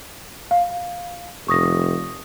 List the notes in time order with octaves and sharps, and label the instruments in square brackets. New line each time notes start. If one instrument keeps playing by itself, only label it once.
[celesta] F5
[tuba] F1 [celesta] C#6 D#6 A#6